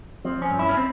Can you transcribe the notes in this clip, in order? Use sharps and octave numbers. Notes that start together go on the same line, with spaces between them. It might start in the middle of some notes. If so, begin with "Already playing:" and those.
F3 C4
C#4
G2
E4
C#4
C4